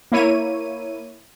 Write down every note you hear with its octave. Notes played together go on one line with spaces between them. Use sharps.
A#3 E4 C#5 D#7